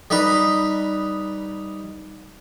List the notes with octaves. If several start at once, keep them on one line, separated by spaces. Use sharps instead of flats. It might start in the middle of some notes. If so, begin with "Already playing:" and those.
G3 D#4 B4